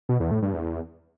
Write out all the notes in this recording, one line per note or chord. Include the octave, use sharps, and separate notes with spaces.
B2
E2
A2
G2
E2